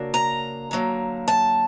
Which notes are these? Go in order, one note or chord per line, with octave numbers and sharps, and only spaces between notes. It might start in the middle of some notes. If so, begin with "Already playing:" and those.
Already playing: C#3 F#3 A#3 D4
A#5
D3 F#3 A#3
A5